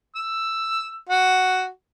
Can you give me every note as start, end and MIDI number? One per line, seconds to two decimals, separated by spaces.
0.16 0.98 88
1.09 1.68 66